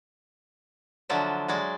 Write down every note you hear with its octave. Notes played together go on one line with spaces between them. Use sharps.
D3 F3 F#3 D5 E5
F#3 G#3 D5